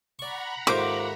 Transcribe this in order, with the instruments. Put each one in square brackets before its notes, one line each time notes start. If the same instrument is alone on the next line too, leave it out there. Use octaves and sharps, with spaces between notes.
[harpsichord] D5 C#6 [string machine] F#5 A#5 B5
[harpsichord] D#2 G#2 A3 [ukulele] F4 C5 [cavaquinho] D6